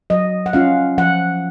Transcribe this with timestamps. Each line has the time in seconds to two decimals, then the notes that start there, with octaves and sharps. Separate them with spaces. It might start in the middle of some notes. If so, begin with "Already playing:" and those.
0.10 F#3 D#5
0.46 F#5
0.53 C#4 F4 F5
0.98 F3 F#5